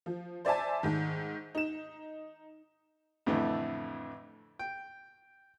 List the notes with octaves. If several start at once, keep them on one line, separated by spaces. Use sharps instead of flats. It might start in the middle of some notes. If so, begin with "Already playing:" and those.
F3
C5 D5 E5 G#5 A5
G#2 D#3
D#4 E7
F2 A2 D3 E3 A3
G5